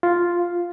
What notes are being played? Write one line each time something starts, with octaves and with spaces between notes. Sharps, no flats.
F4